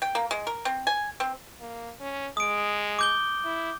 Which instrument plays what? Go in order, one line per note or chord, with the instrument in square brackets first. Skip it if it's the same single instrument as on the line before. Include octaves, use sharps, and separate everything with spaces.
[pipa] G5
A#3
G#3
A#4
C4
G#5
C4
[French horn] A#3
C#4
[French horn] G#3 [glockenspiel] D#6 D7
[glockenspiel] D6 G6 G7
[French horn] E4